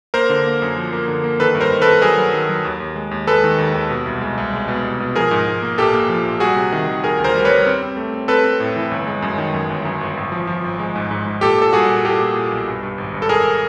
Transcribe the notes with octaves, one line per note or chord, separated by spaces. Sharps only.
A#3 A#4 C5
D3
A#3
F#2
F3
A#3
D3
A#3
D#3 A4 B4
G2
A#4 C5
D#3
A4 B4
G2
F#3 G#4 A#4
F#3
D#3
F#3
D#2
D#2
G#3
D#2
G#3 A4 B4
D#3
D#2
D#2
B2
C2
G#3
C2
G#3
B2
C2
B2
F3 G#4 A#4
G#2
G#2
A#3
A#1 G4 A4
A#3
F3
A#1
G3 F#4 G#4
C3
D#3
D#3
D#3 G#4 A#4
D2
A#4 C5
G3
G3 B4 C#5
C4
C4
A3
C4
C4 A4 B4
C4
A2
E3
G1
G#3
F#2
D#3
F#2
G1
F#2
G1
G#1
F3
F3
G#1
G#3
G#2
G#2
G#2
A#2 G4 A4
A#2 A4
G3 F#4 G#4
A#2
A#2 G4 A4
A#2
A#2
B1
G2
G2
G#1
G2
A4
G#1 G#4 A#4